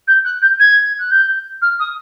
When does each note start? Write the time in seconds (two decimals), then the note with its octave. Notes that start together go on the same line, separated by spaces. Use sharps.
0.07 G6
0.24 F#6
0.41 G6
0.59 G#6
0.99 F#6
1.10 G6
1.61 F6
1.79 D#6